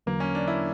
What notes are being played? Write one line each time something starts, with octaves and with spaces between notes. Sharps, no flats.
E2 D3 F#3 A#3
C#4
D4
E4